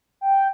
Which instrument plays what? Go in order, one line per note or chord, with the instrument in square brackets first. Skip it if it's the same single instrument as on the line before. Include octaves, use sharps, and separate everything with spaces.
[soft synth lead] G5